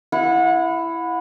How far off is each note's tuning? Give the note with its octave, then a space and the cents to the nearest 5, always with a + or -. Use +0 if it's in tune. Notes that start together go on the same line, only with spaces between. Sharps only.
E4 +10 F#5 -30